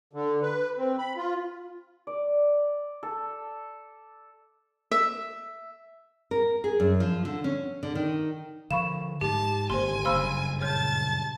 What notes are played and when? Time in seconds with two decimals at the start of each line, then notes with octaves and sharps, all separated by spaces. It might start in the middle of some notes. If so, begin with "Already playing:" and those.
0.13 D3
0.42 B4
0.77 C4
0.98 B5
1.17 F4
2.07 D5
3.03 A4
4.91 E5
6.31 A#4
6.64 G#4
6.80 F#2
7.00 F3
7.25 D3
7.44 C#4
7.83 D3
7.95 D#3
8.71 D3 F3 F5 B5 C#6 E7
9.21 G#2 G#3 G4 A5
9.70 G#1 D3 A#3 G4 C5 G#5 C6
10.05 F#1 G2 C5 F5 B5 C6 E6 F6
10.61 A#2 C#5 A5 F6 G6 A6